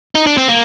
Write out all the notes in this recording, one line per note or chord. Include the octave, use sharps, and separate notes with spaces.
D#4
D4
C4
A#3